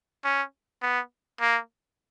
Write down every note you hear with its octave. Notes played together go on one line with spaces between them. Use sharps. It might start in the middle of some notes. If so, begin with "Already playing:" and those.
C#4
B3
A#3